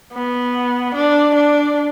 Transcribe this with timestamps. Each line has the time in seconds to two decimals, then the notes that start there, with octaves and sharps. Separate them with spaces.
0.13 B3
0.95 D4
1.35 D4